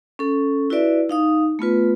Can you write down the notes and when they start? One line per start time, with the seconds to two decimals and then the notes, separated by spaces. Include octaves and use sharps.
0.19 C#4 A4
0.70 E4 F#4 B4 D5 E5
1.09 D#4 F5 D#6
1.59 A3 B3 F4 B4